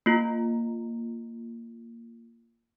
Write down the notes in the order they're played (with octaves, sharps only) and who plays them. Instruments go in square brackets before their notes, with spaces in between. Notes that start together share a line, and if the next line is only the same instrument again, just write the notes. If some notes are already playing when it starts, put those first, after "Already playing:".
[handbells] A#3 F4